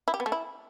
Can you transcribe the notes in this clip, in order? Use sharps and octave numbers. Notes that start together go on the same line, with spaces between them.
E4
G4
B3
A3
E4